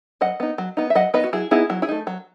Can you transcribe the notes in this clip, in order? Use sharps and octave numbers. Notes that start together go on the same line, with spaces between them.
F#3 D#5 F#5
B3 D#4
F#3
B3 D#4
E5
F#3 D#5 F#5
B3 D#4 B4 D#5
F#4
F#3 E4 G#4
B3 D#4 E4 G#4
F#3 E4
E4 G#4
A3 D#4
F#3